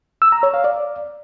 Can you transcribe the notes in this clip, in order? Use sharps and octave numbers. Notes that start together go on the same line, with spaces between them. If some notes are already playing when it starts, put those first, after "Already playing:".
E6
A#5
C#5
F5
D5